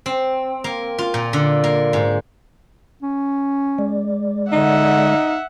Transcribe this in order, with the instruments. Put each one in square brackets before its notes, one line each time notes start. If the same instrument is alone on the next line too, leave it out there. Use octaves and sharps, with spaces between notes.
[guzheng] C4
A#3
F4
A#2
D3
A#3
G#2
[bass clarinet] C#4
[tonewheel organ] G#3 D5
[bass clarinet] D3 [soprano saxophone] D#4 [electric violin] E5 F#5